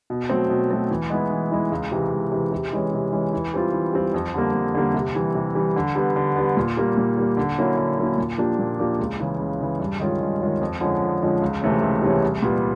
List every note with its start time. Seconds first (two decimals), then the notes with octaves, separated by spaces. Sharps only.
0.10 B2
0.29 F#3 A3 C4
0.49 B2
0.71 F#3 A3 C4
0.90 E3
1.10 G#3 B3 E4
1.31 E3
1.52 G#3 B3 E4
1.72 C#2
1.92 C3 E3
2.12 C#2
2.32 C3 E3
2.52 C3
2.72 E3 G#3 C#4
2.93 C3
3.12 E3 G#3 C#4
3.33 E3
3.54 G3 C4 F4
3.73 E3
3.93 G3 C4 F4
4.14 F2
4.34 D3 G3 A#3
4.54 F2
4.74 D3 G3 A#3
4.94 C3
5.15 E3 G3
5.35 C3
5.55 E3 G3
5.76 D3
5.95 G3 B3
6.16 D3
6.36 G3 B3
6.57 A#2
6.77 G3 A#3
6.98 A#2
7.18 G3 A#3
7.37 D3
7.58 F#3 A#3 C#4 E4
7.77 D3
7.98 F#3 A#3 C#4 E4
8.18 A#2
8.38 F3 A#3 D4 G4
8.59 A#2
8.79 F3 A#3 D4 G4
8.99 C#2
9.19 C#3 E3
9.40 C#2
9.61 C#3 E3
9.80 G2
10.00 D#3 G#3 C#4 F4
10.21 G2
10.40 D#3 G#3 C#4 F4
10.61 F2
10.81 D3 F3 G#3 C#4
11.02 F2
11.22 D3 F3 G#3 C#4
11.41 C#2
11.62 C3 E3 A3 C#4
11.82 C#2
12.02 C3 E3 A3 C#4
12.23 C2
12.43 A#2 G3 B3